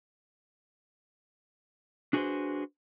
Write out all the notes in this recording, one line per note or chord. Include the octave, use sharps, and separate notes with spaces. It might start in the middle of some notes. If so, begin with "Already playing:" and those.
D4 F#4 G#4 A4 B4 C5